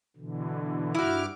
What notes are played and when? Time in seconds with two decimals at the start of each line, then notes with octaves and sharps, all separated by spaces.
0.16 B2 D3 E3
0.95 G2 E4 F#4 D6 F6